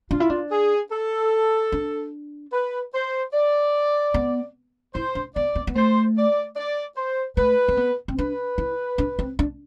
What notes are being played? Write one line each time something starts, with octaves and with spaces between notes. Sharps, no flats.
D4 F4
E4
D4
G#4
A4
D4
B4
C5
D5
B3
E4 C5
D4
B3 D5
B3
B3
A3 C5
D5
D5
C5
A3 B4
C4
B3
C4
D4 B4
E4
D4
C4
D4